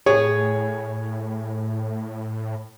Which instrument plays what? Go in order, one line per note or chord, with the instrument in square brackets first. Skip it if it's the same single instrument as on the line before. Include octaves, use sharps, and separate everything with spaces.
[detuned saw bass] A2 [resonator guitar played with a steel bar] G#4 [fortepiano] C#5